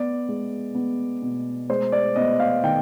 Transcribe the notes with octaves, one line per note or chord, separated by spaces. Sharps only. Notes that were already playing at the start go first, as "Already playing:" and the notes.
Already playing: B3 D5
G#3
B3
B2
G#3 C5
D5
B3 D#5
F5
D#3 G5